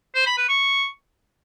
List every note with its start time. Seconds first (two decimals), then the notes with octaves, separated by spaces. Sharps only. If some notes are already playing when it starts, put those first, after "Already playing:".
0.15 C5
0.26 B5
0.37 B4
0.49 C#6